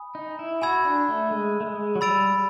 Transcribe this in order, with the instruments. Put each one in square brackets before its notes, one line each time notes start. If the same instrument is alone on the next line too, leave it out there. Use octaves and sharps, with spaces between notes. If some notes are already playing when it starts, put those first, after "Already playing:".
Already playing: [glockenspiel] G#5 B5 D#6
[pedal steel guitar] D#4
E4
[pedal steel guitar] F#4 [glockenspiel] G#5 B5 E6 G#6
[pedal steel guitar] D4
A3
G#3
A3
G#3
F#3
[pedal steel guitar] G3 [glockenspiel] B5 E6 A6 D7 F7